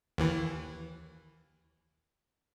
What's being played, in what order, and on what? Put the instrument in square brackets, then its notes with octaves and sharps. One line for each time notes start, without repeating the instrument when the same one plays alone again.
[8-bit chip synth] D#2 E3